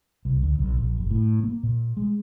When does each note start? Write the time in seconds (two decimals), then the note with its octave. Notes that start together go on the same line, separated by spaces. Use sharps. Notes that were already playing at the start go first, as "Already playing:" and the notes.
0.25 C2
0.43 D2
0.59 B1
0.77 A#1
0.98 F#1
1.11 A2
1.44 A#3
1.63 A#2
1.97 G#3